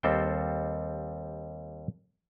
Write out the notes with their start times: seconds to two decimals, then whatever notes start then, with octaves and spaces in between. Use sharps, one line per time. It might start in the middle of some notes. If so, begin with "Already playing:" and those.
0.03 D#2 G3 C4 A4 C5 G5